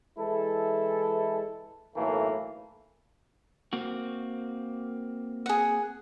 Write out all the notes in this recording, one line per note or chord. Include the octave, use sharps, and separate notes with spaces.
E3 G#3 E4 A4
B1 A2 E3 A3 A#3
A#3 C4 F#4
G#4 F#5